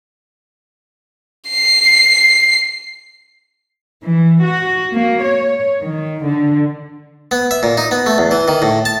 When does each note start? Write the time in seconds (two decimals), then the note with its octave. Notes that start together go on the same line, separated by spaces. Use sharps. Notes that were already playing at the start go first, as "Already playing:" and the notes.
1.48 C7
4.03 E3
4.42 F#4
4.95 A#3
5.24 C#5
5.82 D#3
6.27 D3
7.31 B3
7.51 E5
7.63 A#2
7.77 D#4
7.91 B3
8.06 A3
8.18 E2
8.31 E3
8.48 D#3
8.62 A2
8.85 A5